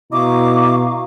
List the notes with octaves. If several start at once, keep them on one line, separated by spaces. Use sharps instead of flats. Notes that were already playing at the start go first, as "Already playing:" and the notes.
B2 E4 D#5 F5 A#5 C#6 D6